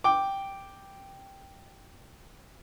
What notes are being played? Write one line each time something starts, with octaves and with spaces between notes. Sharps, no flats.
G5 D6